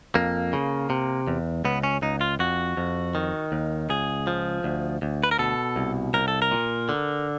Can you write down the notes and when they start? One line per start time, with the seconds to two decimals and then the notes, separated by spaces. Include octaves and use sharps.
0.15 F2 A#3
0.53 C#3
0.90 C3
1.27 E2
1.65 C#2 B3
1.84 C#4
2.02 C#2 D#4
2.21 F4
2.39 F2 F#4
2.77 F2
3.15 D#3
3.52 D#2
3.90 C#2 G#4
4.27 F3
4.64 D2
5.02 D2
5.24 B4
5.31 A#4
5.39 B2 A4
5.76 C2
6.14 C2 A#4
6.28 A4
6.42 A#4
6.51 A#2
6.89 D3